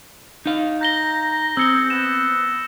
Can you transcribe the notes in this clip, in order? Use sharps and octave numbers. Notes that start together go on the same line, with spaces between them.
D#4 F5
A#5 G6 A#6 G7
C4 G#4 E6 C#7 G7
B3 E7